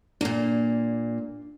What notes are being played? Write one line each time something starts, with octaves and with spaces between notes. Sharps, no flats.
A#2 A#3 D4